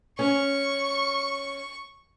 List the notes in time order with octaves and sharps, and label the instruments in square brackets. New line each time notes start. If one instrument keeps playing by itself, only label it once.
[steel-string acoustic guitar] C#4 [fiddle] C#6